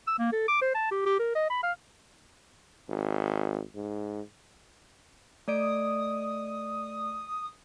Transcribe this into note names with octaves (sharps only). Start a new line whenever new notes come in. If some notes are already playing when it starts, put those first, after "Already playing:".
E6
A#3
A4
D6
C5
A5
G4
G4
A#4
D#5
B5
F5
G#1
G#2
A3 D5 D#6 D7